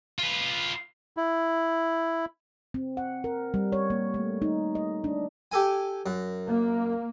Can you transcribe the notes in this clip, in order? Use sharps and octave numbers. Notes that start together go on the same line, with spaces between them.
F4 B4
E4
C4
F#5
A#4
G3
C#5
A#3
A3
D#4
D#5
D4
G4 A4 G#5
F#2
A#3